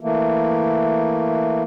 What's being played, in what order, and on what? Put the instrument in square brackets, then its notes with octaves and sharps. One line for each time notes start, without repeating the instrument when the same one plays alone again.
[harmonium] E3 A3 A#3